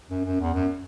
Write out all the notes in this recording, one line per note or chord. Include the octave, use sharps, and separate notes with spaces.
F#2
F#2
E2
F#2